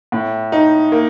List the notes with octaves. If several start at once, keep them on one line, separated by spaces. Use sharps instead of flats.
A2
D#4
A#3